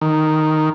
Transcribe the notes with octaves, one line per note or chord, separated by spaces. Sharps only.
D#3